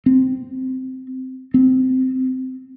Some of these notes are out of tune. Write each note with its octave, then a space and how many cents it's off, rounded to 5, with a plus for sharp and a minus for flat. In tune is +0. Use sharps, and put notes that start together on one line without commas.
C4 -10
C4 -15